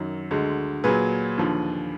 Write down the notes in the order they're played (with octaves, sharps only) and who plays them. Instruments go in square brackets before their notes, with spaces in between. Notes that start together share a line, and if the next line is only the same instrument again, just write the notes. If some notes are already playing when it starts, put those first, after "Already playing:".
Already playing: [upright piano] F#2 D#3 F#3
D2 D3 G#3
A#2 F#3 G#4 B4
D#2 D3 F3